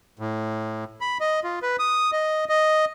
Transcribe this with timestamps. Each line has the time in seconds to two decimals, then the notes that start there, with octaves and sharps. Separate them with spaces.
0.19 A2
1.01 B5
1.20 D#5
1.44 F4
1.62 B4
1.79 D#6
2.12 D#5
2.49 D#5